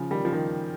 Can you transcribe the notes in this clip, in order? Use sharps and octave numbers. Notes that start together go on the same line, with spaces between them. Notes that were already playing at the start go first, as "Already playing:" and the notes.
Already playing: C#3 F3
D#3 G3
F3
D#3 G3